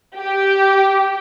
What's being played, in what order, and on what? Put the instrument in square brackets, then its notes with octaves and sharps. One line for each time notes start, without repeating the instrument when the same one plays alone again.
[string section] G4